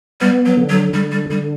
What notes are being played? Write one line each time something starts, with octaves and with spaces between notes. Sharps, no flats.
G3 B3
F#3
D3
F#3
D3 G3
G3
D3 G3